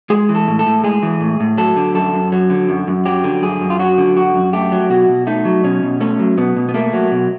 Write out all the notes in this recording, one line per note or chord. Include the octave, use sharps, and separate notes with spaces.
G#3 G#4
E3
A4
A2
A4
A2
G#3 G#4
E3
A2
A2
F#3 A4
D3
F#2 A4
F#2
F#3
D3
F#2
F#2
F#3 G4
D3
F#2 G#4
F#2
F4
F#3 F#4
D3
F#2 F#4
F#2
A3 G4
F#3
B2 F#4
B2
A3 D#4
F#3
B2 C#4
B2
A3 C#4
F#3
B2 B3
B2
B3
A3 A#3
F#3
B2